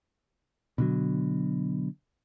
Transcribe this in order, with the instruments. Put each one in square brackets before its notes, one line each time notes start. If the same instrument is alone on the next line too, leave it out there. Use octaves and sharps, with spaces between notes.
[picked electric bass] B2 D3 F#3